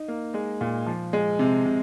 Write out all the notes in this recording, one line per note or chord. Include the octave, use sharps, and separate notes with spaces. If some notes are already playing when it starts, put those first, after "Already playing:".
Already playing: D#4
A#3
G#3
A#2
F3
G#3
C3
C3